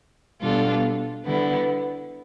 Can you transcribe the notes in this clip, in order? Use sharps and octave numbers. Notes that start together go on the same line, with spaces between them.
B2 G3 D4 F4 A4
D3 G3 B3 E4